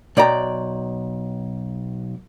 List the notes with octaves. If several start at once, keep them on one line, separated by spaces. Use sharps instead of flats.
B1 D5 G5 A#5